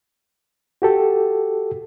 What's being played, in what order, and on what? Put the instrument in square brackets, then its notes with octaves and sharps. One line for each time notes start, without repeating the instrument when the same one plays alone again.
[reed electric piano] F#4 G4 A4